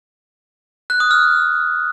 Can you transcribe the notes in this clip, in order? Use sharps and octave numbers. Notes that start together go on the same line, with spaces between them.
F#6
D#6
F6